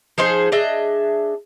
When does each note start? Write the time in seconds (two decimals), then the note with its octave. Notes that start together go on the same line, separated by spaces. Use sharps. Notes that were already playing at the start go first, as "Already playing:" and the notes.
0.18 F3 D#4 G#4 C5
0.52 D4 G#4 D#5 E5